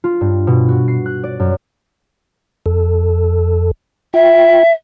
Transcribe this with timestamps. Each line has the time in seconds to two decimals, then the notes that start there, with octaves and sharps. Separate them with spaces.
0.04 F4
0.21 G2
0.47 B2
0.69 F#4
0.88 C7
1.06 F#6
1.24 D5
1.40 F#2
2.66 F2 A4
4.14 F4 E5 G5